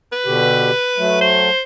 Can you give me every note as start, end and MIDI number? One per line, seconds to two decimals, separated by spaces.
0.13 1.20 71
0.26 0.71 47
0.26 0.71 50
0.26 0.71 67
0.98 1.50 54
0.98 1.50 57
1.21 1.62 72